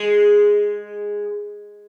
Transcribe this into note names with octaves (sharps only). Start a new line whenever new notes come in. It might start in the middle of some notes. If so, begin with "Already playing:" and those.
Already playing: G#3